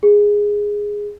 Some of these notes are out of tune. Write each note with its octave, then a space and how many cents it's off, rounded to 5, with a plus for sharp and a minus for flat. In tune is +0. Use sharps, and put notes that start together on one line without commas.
G#4 -10